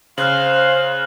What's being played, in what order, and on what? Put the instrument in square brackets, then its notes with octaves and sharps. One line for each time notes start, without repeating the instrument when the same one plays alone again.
[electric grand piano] C#3 [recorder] C5 [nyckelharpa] F5 [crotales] F6 F#6 F#7